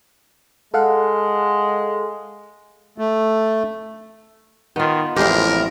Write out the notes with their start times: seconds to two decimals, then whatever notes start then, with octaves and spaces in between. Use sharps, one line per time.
0.74 G#3 A4 F5 F#5
2.98 A3
4.76 D#3 B3 F4
5.16 A1 F2 G#3 E4 G4 A#4